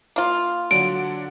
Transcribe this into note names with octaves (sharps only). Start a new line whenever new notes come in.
A#3 F4
D3 F#3 D4 D7